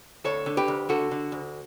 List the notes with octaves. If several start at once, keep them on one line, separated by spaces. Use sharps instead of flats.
D2 A4 C#5
D3
G4 B4
D2
D3 F#4 A4
D3
D2